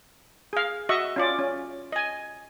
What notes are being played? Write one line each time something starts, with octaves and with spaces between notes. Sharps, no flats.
G#4 F5
F#4 D#5 E5 C#6
C#4 F4 D5
C#4
D#5 G#5